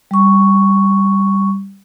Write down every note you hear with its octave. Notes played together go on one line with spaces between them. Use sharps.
G3 C#6